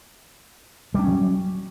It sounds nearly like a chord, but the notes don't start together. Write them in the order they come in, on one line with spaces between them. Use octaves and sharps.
G3 D4 C#4 F#3